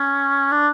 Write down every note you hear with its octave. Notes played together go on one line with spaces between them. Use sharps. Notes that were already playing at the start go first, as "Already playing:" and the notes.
Already playing: C#4
D4